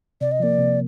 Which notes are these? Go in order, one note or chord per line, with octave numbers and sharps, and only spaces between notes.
C3 D5
D#5
F3 A#3 D5
C3